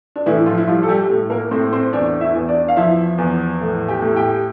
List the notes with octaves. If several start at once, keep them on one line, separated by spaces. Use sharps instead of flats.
D4
A2 E3 E4
F3 F4
E4
F3 G3 F4
A4
G3 G4
A2
A#3 A#4
A2 C4 C5
C4 C5
E2 D4 D5
E4 E5
E2
D4 D5
F5
F3 E4 E5
E2
A2
G4 G5
A2
G4 G5